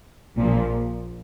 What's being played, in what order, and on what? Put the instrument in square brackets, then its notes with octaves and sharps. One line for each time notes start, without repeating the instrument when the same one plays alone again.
[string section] A#1 A#2 F3